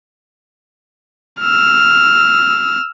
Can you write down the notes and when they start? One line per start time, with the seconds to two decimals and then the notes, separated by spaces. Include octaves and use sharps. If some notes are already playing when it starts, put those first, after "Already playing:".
1.40 E6 F6